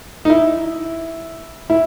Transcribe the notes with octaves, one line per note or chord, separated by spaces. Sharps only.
D#4
E4
E4